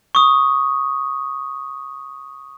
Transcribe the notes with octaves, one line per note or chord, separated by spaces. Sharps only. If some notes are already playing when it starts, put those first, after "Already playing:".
C#6 D#6